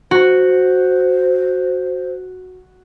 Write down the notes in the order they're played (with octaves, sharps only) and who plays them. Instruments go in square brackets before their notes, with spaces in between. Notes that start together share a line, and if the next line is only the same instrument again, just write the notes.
[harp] F#4 [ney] C5